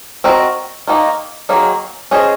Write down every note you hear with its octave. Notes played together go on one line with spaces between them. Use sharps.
C4 F#4 A#4 D#5
D#3 A#3 D#4
D#3 F#3 A#3 D#4 G#4
C#4 G#4 C5 D#5